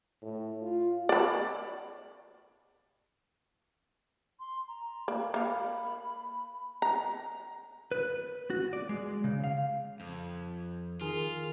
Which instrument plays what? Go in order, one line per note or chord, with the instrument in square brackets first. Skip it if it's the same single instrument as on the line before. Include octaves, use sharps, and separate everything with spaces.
[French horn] A2
F4
[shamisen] D5 B5
[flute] C6
A#5
[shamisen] A#3 D5 B5
[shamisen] A#3 F5 [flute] B5
[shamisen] A#5
[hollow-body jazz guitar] B4
F#4
D5
G#3
C#3
F5
[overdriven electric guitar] F2
[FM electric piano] D#3 G#4 A#4 [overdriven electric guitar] F4